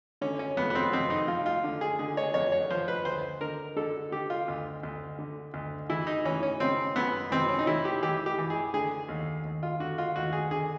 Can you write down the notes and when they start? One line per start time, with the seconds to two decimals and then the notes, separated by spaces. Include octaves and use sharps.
0.21 D3 C#4
0.39 C#4
0.57 F2 B3
0.70 B3
0.75 C4
0.93 F2 C4
1.10 D#4
1.28 F3 F4
1.46 F4
1.64 D3
1.81 G#4
1.99 D3 G#4
2.17 C#5
2.34 F2 C#5
2.52 C#5
2.70 F3 C5
2.88 B4
3.05 D2 C5
3.41 D3 A#4
3.76 D3 A4
4.12 D3 G4
4.30 F4
4.48 D2
4.83 D2
5.19 D3
5.54 D2
5.89 E3 E4
6.07 D#4
6.25 E3 C#4
6.43 C#4
6.60 C#3 C4
6.96 F#2 B3
7.31 E3 C4
7.49 C#4
7.59 D#4
7.67 E3 E4
7.85 G4
8.02 E3 G4
8.26 G4
8.38 E3
8.50 G#4
8.74 D3 G#4
9.09 D#2
9.45 D#2
9.63 F4
9.80 D3 F#4
9.98 F4
10.16 D#2 F#4
10.33 G#4
10.51 D3 G#4